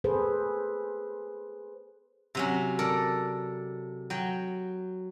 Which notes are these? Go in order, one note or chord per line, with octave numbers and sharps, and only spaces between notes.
G#4 A4 B4 C5
C3 F#3 C#4
A4 A#4 D5
F#3 G5